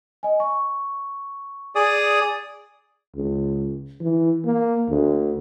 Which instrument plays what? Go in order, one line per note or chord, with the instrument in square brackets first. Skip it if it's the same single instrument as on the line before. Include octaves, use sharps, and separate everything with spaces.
[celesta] D#5 G#5
C#6
[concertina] G#4 D5 D#6
[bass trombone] C#2
E3
A#3
D2